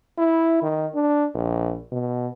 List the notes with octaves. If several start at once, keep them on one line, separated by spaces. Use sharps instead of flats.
E4
D#3
D4
A#1
B2